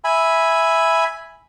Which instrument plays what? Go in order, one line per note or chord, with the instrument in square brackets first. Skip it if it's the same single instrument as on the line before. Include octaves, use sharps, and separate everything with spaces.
[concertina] E5 G#5 B5